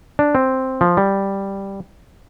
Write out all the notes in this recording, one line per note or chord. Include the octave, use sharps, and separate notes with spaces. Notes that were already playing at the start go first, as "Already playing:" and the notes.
D4
C4
F3
G3